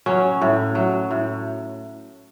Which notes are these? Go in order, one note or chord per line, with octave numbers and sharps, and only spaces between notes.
F#3 C#4
A2
F#3
A2